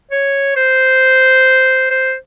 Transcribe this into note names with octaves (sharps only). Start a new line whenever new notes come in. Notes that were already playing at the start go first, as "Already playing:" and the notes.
C#5
C5
C5